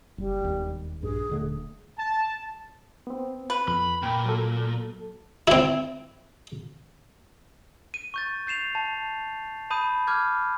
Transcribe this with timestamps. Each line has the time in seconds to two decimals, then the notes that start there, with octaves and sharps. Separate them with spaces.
0.18 F#1 G3
0.44 E1 D#2
1.03 A#1 G2 G#4
1.29 D#1 D3 A3
1.98 A5
3.07 B3 C4
3.50 B4
3.68 F2 B5
4.03 A#2 G5 B5
4.25 F#3 A4
5.48 C4 E4
7.94 D#7
8.14 C#6 G6 A6
8.47 G6 C7 E7 F7
8.75 A5
9.70 A5 B5 D#6 G6 D#7
10.07 D6 F6 G6 G#6